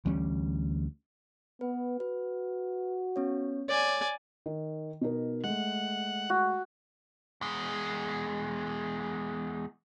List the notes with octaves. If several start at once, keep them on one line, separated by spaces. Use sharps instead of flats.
D2 E3 G3 C#4
B3 B4
F#4 B4
B3 C#4 C#5
C#5 D5 G#5
D#3
B2 D#4 A#4
G#3 A3 F#5
F#4
E2 G#3